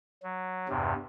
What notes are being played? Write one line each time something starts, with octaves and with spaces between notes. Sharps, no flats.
F#3
E2 G2 C3